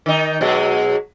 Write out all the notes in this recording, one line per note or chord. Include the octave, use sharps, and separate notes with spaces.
D#3 D#4
B2 F#3 G#3